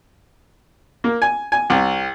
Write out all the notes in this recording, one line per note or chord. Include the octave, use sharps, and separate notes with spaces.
A#3
G#5
G#5
C2